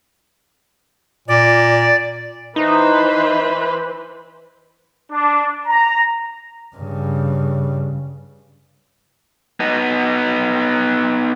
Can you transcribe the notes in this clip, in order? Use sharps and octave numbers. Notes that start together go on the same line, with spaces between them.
A#2 D5
E3 D#4 B4 C5
D4
A#5
G2 C#3
B3 D#4